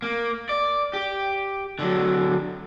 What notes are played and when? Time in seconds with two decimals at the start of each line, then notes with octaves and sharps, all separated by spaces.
0.02 A#3
0.49 D5
0.93 G4
1.79 D3 F#3